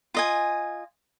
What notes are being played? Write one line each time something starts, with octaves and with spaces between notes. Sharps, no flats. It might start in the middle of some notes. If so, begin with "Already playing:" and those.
F4 D#5 G#5